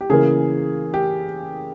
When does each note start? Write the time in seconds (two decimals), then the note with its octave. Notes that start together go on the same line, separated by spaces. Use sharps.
0.01 G4
0.10 C#3 E3 A#3 G#4
0.94 G4